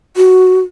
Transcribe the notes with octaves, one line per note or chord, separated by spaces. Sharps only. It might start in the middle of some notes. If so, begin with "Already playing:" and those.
F#4